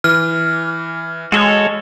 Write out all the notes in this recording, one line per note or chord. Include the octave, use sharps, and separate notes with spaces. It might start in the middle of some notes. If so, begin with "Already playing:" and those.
E3 F6
G#3 F#4 A4 C#5